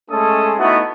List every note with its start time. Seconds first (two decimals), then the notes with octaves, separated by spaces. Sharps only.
0.11 G#3 A3 C#4 A4 A5 D#6
0.59 A3 B3 D#4 E4 F#4